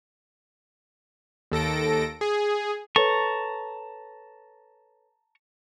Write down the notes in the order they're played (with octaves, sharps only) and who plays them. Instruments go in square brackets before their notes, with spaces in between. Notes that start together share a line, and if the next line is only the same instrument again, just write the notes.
[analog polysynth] D#2 A4 A#6 D7
G#4
[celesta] A4 B4 C#5 [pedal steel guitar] A5 A#5 C#6